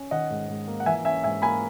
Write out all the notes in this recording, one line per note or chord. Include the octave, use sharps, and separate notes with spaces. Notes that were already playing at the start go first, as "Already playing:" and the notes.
Already playing: C#4
D#3 D#5 F#5
G#2
G#2
A#3
F#5
E3 E5 G#5
C#4 E5 G#5
G#2 E5 G#5
A#3 G#5 B5